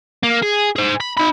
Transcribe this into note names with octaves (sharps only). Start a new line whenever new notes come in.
A#3
G#4
G#4 C5
B5
D#4 B5